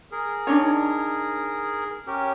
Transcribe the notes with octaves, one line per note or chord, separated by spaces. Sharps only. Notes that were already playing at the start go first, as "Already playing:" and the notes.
G#4 A#4
D4 D#4 C#5
C#4 G4 A#4